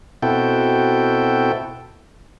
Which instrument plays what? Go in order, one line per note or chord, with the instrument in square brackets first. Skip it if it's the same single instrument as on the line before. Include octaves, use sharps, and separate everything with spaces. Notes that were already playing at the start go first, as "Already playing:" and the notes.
[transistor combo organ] B2 C4 E4 F#4 A4 G5